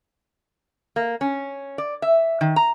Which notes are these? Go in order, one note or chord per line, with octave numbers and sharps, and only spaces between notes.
A#3
C#4
D5
E5
D#3
A#5